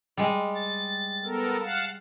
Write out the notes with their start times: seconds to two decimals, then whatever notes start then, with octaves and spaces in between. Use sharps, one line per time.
0.17 G3 G#3
0.55 A6
1.24 B3 A4 A#4
1.61 F5 F#5 A5